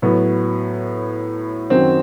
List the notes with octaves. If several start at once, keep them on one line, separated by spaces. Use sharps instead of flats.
A2 F#3 B3
F#2 D#3 F#3 C4